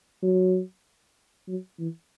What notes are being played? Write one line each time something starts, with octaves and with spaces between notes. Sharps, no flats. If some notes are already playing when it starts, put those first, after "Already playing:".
F#3
F#3
E3